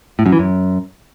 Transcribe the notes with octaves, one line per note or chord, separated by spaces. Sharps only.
A2
F#2
E3
F#2